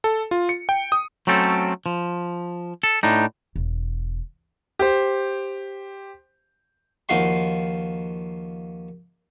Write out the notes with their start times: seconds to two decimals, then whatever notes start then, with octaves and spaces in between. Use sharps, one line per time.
0.04 A4
0.31 F4
0.49 C#7
0.69 G5
0.92 D#6
1.27 F#3 A3 C4 C#4 A4
1.86 F3
2.83 A4
3.03 A2 D4 D#4
3.56 E1
4.79 G4 C5
7.09 D#2 F3 D#4 F4 F#4 C6